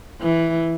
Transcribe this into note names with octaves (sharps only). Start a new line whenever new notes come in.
E3